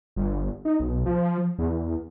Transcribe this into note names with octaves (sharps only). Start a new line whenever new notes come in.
G1
D#4
B1
F3
E2